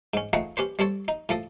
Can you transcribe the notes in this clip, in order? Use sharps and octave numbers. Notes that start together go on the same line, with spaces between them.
G#2 C#4
F3 A3 D#4 G#4 F#5
C#4 G4 B4 C5
G3 C4 A4 C#5
D#4
A2 F3 A4 D#6